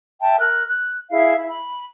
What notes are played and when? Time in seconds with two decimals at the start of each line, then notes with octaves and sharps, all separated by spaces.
0.21 E5 G5 A5
0.40 A#4 F6 F#6
0.67 F#6
1.11 E4 G#4 E5 F5
1.37 E4
1.50 B5